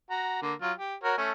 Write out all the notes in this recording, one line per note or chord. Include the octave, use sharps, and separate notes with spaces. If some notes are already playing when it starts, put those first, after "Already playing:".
F#4 A#5
D3 A#3
F#3 F4
G4
F#4 A#4 C#5
A3 C#4 A4